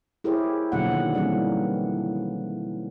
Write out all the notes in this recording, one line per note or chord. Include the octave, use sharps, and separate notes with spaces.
E4 G4 G#4 A#4 C5 C#5
B2 D3 F3 F#3 A#3 F#5
D#3
E3 G3 A#3 C4 C#4